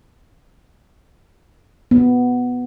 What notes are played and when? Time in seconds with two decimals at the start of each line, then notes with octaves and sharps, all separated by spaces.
1.91 B3